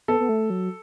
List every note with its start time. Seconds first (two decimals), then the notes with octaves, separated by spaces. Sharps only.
0.08 B3 A4
0.20 B3
0.29 A3
0.50 F#3